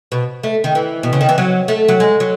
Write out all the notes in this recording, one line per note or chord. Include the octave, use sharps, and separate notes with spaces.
B2
A3
D#3
E3
B2
C#3
D#3
E3
F#3
A3
F#3
G#3
F#3